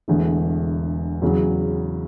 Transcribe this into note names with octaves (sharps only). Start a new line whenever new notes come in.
E1 E2 D3 A3
E2 C#3 F#3